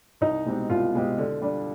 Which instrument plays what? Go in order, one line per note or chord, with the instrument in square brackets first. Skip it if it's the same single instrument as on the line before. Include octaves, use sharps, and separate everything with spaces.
[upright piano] C2 [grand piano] D#4
[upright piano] B2 G#3 C4 G4
[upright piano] C2 [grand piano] F4
[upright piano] B2 G#3 C4 G4
D3
G3 D4